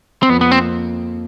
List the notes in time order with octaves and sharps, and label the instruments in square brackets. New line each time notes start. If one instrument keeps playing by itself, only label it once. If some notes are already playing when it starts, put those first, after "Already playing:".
[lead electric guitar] C4
[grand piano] F2 [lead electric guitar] B3
[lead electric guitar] B3
[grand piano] A#3 [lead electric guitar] C4